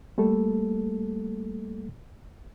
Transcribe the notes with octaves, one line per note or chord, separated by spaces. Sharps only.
G3 A3 A#3 A4